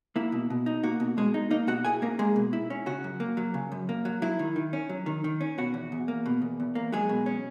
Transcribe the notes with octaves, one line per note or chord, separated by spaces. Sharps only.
A#3 E4
B2
B2
D#4
A#3 F#4
B2
B2 G#3 G#4
D#4
A#3 D#4 D#5
B2 F#4 F#5
E4 G#4 G#5
A#3 C#4 A#4
G#3 A#3 G#4
B2
E4
C#4
C#3 F#4
F#2
A#3
F#3
C#3
F#2
A#3
F#3
F#3 E4
D#3
D#3
C#4
F#3
D#3
D#3
C#4
B2 F#4
E2
E2
A#3
B2
E2
E2
A#3
F#3 G#3 G#4
B2
C#4